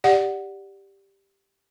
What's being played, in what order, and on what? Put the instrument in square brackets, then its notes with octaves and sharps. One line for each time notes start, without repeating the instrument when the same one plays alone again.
[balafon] G4 D5 F#5